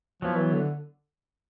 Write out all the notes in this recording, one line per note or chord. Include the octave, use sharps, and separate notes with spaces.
F3 F#3 B3 E4
E3
D3